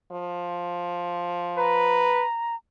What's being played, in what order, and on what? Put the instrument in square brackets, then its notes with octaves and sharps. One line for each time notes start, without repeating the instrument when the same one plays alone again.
[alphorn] F3
[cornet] B4 [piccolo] A#5